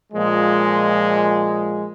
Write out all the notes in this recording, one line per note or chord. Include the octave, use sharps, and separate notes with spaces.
A#2 F3 G#3